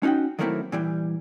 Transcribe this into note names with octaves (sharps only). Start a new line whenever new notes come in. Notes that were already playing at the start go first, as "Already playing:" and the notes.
C#4 D#4 F#4 F#5 G5
D#3 F#3 A3 A#3 C4 E4
A#2 E3 G3